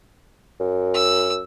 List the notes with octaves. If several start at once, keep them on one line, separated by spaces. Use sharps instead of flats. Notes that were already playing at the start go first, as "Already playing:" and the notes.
F#2
E6